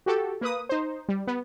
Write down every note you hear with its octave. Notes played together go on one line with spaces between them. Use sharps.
F#4 G4 A4
A#3 B4 D#6
D#4 C5
G3
B3